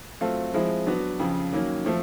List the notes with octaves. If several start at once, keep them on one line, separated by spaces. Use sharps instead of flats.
F#3 A3 C4 F4 A4
F3 G#3 C4 E4
F#3 B3 D4 F#4
F2 C#3 F3
D#3 F#3 A#3 C#4
F3 A3 C4